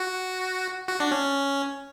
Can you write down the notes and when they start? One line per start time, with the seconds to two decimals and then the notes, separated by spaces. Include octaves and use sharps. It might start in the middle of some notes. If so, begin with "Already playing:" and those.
Already playing: F#4
0.88 F#4
1.00 D4
1.11 C#4